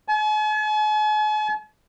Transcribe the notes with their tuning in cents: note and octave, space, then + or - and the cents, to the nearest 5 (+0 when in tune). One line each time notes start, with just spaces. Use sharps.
G#5 +45